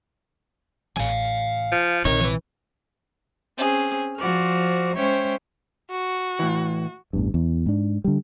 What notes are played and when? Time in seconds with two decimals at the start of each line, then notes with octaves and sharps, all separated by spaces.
0.97 A1 F5 G#5
1.72 F3
2.05 A#1 C3 D#4 A#4 C#5
2.21 E3 B4
3.58 C4 C#4 G#4
4.17 F3 F#4 C5 D5 F6
4.95 G#3 C#4 C5 C#5 E5 G5
5.92 F#4
6.39 A2 E3
7.13 A1 E2 G2
7.34 E2
7.66 G#2 D4
8.04 D3 G3